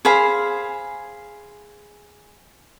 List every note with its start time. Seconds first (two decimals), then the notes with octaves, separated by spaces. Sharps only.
0.05 G#4 C5 F5 B5